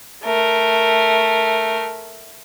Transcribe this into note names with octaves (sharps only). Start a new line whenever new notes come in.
A3 A#4